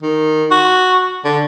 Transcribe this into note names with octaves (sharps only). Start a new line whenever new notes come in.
D#3
F#4
D3